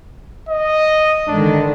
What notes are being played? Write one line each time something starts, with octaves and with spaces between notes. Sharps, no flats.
D#5
G#2 D3 D#3 D4